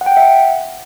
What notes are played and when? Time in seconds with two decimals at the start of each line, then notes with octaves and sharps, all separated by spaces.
0.01 F#5
0.06 G5
0.12 F#5
0.17 E5
0.22 F#5